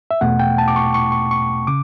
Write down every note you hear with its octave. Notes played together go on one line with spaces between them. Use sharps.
E5
E2 B2 A3 F#5
G5
A5
D6
C#6
C#6
C#6
C#6
C#3 D6